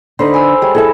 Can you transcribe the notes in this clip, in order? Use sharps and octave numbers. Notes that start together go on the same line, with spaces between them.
D3 D#4 B4 C5
G#5 A#5 E6
G3 G#3 C#5
E4 G#4 A4 E5